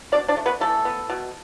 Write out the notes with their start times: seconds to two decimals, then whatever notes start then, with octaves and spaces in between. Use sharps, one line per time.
0.12 B2 D4 D5
0.28 D4 D5
0.37 A3
0.46 B3 B4
0.61 E3 A3 A4
0.85 B3
1.10 B2